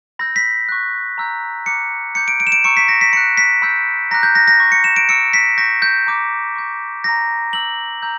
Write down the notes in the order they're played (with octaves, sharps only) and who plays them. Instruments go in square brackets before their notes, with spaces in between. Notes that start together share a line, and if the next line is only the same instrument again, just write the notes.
[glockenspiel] B5 E6 G6 A#6
B6
C#6 F#6
A#5 E6 G6
A#5 D6 F#6 C#7
B5 D6 G6 C#7
D7
D7
E7
D7
A#5 C#6 E6 G6 C#7
B6
A#6
B6
B5 C#7
F#6
B6
B5 E6 G6
A#5 D6 F#6 A#6
G6
A#6
A#6
C#6 G6
C#7
E7
D7
C#6 E6 G6 C#7
B6
C#6 G6 A#6
G6
A#5 D6 G6
C#6 G6
A#5 E6 G6 A#6
A#5 E6 G6 F#7
A#5 E6 G6